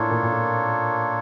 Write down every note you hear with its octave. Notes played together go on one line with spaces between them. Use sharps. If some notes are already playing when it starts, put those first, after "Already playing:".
Already playing: A2 A#3 D4 F4 A4 C#5
A#2
A#2
A2